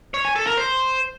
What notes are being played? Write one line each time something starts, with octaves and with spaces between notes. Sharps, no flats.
C#5
G#5
A4
A#4
C5